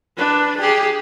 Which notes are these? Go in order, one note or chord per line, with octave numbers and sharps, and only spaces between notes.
D4 B4
G4 G#4